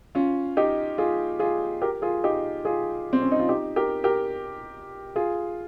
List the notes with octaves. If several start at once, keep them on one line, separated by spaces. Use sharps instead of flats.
C#4 F4
D#4 G4
F4 G#4
F4 G#4
G4 A#4
F4 G#4
D#4 G4
F4 G#4
C4
C#4
D#4
F4
D#4 G4
G4 A#4
G4 A#4
F4 G#4